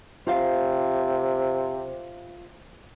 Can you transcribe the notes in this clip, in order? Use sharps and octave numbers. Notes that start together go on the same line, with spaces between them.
C3 F4 C5 F5